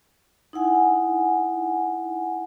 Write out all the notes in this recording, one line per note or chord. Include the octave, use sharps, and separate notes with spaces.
D#4 E4 F#5 G#5